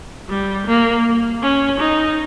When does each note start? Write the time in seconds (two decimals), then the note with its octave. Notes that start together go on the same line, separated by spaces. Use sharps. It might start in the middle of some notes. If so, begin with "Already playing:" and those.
0.29 G3
0.67 A#3
1.42 C#4
1.80 D#4